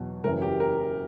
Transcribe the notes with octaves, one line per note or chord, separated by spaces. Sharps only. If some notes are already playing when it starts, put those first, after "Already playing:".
Already playing: E2 B2 F#3
F#1 F#2 C#3 E3 A#4
G4
A#4